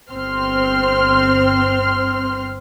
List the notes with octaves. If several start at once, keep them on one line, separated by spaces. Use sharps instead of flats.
G1 C4 C6 F6